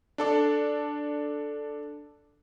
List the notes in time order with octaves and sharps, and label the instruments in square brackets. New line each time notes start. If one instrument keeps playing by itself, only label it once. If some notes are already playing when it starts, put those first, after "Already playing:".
[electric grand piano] D4 A4 D5